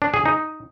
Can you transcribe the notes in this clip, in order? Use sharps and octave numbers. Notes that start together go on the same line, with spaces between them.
D4
G#4
D#4